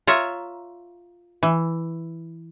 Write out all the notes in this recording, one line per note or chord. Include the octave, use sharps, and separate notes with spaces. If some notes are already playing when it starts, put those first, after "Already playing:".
F4 C#5 E5 A#5
E3